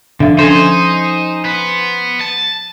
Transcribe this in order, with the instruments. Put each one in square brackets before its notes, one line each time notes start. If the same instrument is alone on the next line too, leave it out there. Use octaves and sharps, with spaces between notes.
[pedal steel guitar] D3 [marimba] F3 E5
[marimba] C#4 A4 [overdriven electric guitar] D#4 [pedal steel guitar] C5 G#5
[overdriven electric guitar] B3
A5